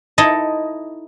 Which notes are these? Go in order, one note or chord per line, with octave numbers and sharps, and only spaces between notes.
D#4 E4 A4 D#5